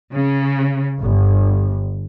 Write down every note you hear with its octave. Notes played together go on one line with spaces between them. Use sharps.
C#3
G1